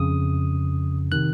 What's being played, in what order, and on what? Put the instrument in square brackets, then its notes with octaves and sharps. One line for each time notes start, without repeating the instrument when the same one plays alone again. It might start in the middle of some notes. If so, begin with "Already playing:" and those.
Already playing: [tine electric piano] F2 C#3 D#6
C3 D#3 F#6